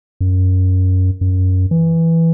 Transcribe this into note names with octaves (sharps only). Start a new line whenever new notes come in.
F#2
F#2
E3